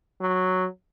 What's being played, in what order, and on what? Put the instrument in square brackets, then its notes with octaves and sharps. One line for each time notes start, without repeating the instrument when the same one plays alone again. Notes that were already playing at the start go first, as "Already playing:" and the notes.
[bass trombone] F#3